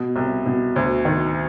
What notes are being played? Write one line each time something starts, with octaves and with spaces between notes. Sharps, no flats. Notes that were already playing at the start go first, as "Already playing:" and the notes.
Already playing: B2
C2
B2
D2
D#3